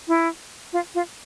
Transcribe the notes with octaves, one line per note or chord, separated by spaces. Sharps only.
E4
F4
F4